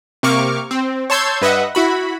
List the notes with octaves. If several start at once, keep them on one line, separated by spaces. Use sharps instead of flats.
C3 A#3 C#6 D6 F6
C4
C#5 A5 C6 E6 G6 G#6
G2 B4 D#5 E5 F#5
E4 F#4 B5